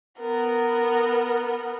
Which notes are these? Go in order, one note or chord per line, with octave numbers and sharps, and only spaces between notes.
B3 A#4